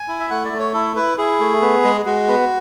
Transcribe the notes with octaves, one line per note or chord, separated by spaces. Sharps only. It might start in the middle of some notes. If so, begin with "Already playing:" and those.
Already playing: G#5
E4
E5
A3 F#5
D5
A3
C#5
E4 A4
E4 B4
E4 G#4
A3
B3
G#3
G#3 F#4
B3